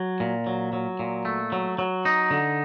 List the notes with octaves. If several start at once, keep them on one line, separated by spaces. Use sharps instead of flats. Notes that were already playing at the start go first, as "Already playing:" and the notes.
Already playing: F#3
A#2
F#3
F#3
A#2
A3
F#3
F#3
D#4
D3